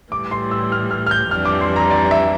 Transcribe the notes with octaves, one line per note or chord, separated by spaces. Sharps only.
A2 E3 G3 D6
C6
E6
F6
F6
F6
G6
F2 E3 G3 D4 F6
D6
C6
A#5
D5
E5